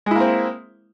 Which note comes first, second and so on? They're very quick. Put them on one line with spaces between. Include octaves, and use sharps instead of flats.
G#3 E4 A#3 C4